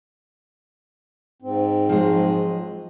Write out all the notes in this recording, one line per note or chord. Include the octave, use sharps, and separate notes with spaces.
G#2 C4
F3 F#3 G#3